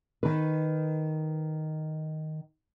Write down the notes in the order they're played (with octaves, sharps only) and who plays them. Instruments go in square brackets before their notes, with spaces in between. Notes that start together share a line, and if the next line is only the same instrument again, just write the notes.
[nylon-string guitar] D#3 B4